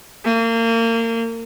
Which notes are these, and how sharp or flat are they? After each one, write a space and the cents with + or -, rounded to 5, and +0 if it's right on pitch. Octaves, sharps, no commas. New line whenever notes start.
A#3 -30